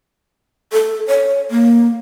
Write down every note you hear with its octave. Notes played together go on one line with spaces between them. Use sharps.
A4
C#5
A#3